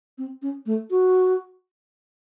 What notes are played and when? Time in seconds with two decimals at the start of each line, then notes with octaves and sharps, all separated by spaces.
0.18 C4
0.42 C#4
0.66 A3
0.90 F#4